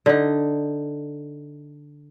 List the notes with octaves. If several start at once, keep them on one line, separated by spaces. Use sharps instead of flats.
D3 D#4